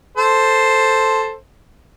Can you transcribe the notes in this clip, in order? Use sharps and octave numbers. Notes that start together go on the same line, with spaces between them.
A4 C5